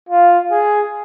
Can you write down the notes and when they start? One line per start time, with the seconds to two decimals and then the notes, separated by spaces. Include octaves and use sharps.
0.09 F4
0.51 G#4